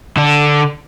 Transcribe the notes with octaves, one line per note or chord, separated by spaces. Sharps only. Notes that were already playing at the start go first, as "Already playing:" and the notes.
D3 D4